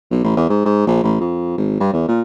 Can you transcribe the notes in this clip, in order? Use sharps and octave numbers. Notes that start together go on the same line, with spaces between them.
B1
A1
E2
G#2
G#2
A#1
A1
F2
G#1
G2
E2
A#2